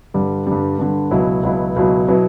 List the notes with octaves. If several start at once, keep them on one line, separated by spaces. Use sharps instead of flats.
G2 D3 G3
G2 D3 G3
G2 D3 G3
C#2 B2 F#3 B3 E4
C#2 B2 F#3 B3 E4
C#2 B2 F#3 B3 E4
B2 F#3 B3 E4